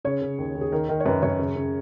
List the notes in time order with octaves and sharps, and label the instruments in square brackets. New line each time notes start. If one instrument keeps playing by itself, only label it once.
[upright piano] C#3 C#5
C#3
D#2
D#2
G#4
D#3 A#4
D#3 A#4
C#5
F#2 B4
F#2 C#5
C#3
C#3